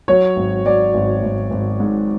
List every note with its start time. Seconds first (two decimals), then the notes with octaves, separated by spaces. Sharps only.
0.08 F#3 C#5
0.36 G#1
0.66 F#3 D5
0.94 G#1
1.23 G#1
1.51 G#1
1.80 G#2